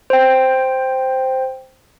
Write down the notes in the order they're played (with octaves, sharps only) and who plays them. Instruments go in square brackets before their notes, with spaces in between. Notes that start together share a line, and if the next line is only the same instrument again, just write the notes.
[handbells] C5 G5